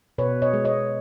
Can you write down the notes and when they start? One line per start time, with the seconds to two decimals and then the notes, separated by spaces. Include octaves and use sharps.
0.18 B2 B4 C#5
0.42 C#5 D#5
0.54 G#3
0.65 C#5 D#5